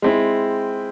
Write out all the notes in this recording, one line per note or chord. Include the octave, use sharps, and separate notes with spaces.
G#3 C4 E4